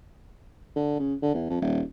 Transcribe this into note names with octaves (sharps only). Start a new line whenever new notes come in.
D3
C#3
D3
E2
F2
D#1